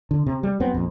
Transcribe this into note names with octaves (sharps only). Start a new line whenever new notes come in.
D3
C3
G3
F#2 B3 C4
A#1 F2